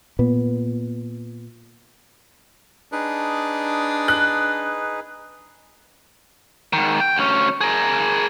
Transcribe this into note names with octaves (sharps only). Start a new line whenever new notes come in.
A#2 B3
D4 D#4 G#4 B4
F#6
G#2 D#3
G5
D2 C#4
G#4 A#4